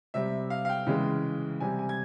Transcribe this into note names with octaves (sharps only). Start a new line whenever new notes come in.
C3 G3 E5
F5
F5
G5
C#3 E3 G#3
C3 G3 G#5
G#5
G#6